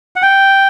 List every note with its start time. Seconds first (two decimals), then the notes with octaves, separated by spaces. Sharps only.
0.16 F#5
0.23 G5